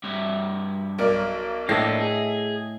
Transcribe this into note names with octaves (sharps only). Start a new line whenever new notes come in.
G2 E5
B1 A#4 D5
A2 A#3 D4 A4 D#5 E5 A#6 C7
G#4